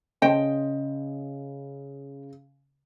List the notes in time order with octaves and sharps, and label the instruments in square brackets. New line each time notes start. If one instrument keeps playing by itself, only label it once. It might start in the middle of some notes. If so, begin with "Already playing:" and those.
[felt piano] C#3 [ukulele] C5 D#5 G5